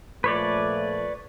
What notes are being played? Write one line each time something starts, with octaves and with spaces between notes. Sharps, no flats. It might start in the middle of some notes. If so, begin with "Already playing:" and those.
A#2 F3 A3 B4 C#5 D5